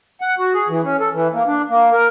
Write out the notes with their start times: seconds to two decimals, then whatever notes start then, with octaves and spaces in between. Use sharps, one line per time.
0.21 F#5
0.38 F#4
0.54 G#4
0.69 E3
0.83 C#4
1.00 A4
1.13 E3
1.34 A#3
1.47 D4
1.69 A#3
1.93 A#4